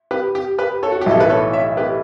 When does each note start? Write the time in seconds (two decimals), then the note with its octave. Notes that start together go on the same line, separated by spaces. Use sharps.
0.11 G4 B4
0.35 G4
0.58 G4 B4
0.83 A4 C#5
0.92 F#4
1.01 G4
1.06 B1 A2 E3 A4
1.20 B4
1.30 A4 C#5
1.53 C#5 E5
1.77 G4 B4